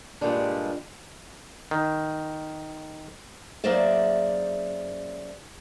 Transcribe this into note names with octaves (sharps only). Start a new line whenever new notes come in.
G2 A#2 G3 G#3 D4
D#3
F#2 A#3 G#4 C5 D5 E5